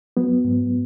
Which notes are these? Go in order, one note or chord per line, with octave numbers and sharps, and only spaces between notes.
F#3 B3
G#2